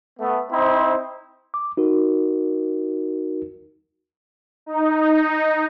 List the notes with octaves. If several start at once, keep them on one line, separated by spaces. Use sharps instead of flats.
A3 B3
C4 D#4 E4 C5
D6
D#4 F#4 A#4
D#4